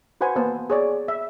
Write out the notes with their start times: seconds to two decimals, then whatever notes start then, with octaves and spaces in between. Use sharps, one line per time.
0.21 F#4 B4 C5 F#5 G#5
0.36 A#3 B3 C5 A5
0.70 G#4 C#5 D5
1.08 E5